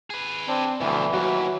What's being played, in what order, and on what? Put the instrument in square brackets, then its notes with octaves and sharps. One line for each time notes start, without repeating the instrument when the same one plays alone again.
[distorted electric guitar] G#4 B4
[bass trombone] C4 [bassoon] D4
[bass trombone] D2 [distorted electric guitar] B2 F3 [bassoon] E3
[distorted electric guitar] D#2 [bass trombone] F#3 [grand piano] F#4